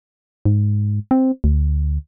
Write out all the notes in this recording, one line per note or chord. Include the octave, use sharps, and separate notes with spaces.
G#2
C4
D2